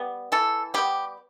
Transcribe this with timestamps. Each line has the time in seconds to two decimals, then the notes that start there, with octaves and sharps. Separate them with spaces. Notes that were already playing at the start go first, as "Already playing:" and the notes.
Already playing: G3 B3
0.32 E3 A4
0.74 G3 B3 G4